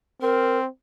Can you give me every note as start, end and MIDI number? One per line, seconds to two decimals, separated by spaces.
0.22 0.68 60
0.22 0.58 70